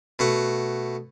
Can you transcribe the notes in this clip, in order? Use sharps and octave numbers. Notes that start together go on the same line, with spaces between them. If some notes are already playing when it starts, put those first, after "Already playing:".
B2 A3 F#5